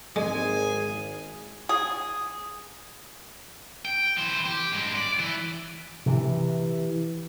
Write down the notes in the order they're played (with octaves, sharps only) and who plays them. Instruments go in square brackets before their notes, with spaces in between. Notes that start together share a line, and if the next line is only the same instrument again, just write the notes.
[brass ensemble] G#1 [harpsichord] G#3 [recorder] G#4 [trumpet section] G#5
[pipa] G#4
[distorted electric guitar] G5
E3 C5
G4
G2 G#3
D5
E3
[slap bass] C3 E3